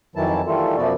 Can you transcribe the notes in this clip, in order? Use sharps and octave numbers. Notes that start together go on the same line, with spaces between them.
F2 D#3 E3 F#3 E4 A5
D#3 E3 G3 A3 F4 A4
F#2 C3 F3 B3 F#4 D5